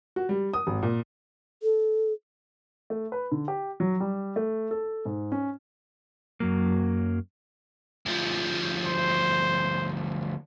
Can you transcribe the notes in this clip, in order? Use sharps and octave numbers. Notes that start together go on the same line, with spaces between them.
F#4
G3
D#6
G#1
A#2
A4
A3
B4
D3
G4
F#3
G3
A3
A4
G#2
C#4
F#2 F#3 A#3
D2 F3
C5